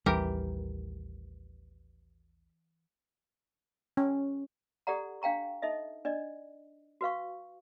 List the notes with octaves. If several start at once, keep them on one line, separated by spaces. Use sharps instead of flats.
A1 D#2 E3 G3 G4 A#4
C#4
G4 A4 D5 F#5 A#5
D4 F5 G5 A#5 C#6
D#4 A4 D#5 E5
D4 D5 D#5
F#4 B4 F5 C#6